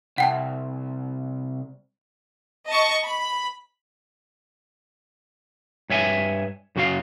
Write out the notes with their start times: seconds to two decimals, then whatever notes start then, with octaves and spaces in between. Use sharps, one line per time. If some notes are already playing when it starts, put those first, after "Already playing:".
0.18 C2 F#5 G5 A5
2.67 D#5 A5 C#6
3.05 B5
5.90 G2 C#5 E5 G#5
6.76 F#2 C#3 F#4 G#4 F5